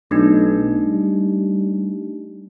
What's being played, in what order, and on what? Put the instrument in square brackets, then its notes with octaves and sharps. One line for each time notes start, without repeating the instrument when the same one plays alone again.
[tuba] B1 [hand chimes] A3 D4 D#4
[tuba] G3